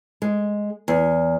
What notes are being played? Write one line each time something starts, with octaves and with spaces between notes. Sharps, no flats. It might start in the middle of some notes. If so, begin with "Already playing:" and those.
G#3
E2